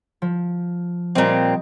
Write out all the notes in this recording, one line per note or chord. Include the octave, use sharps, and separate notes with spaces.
F3
A#2 G3 C4 D#5